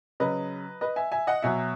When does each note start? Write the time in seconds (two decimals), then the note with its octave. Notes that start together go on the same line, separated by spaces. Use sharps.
0.20 C#3 F#3 B4 D#5
0.81 B4 D#5
0.96 E5 G#5
1.12 E5 G#5
1.27 D#5 F#5
1.42 B2 F#3 E5 G#5